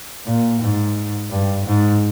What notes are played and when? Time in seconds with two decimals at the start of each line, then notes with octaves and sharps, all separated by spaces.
0.25 A#2
0.60 G#2
1.30 G2
1.65 G#2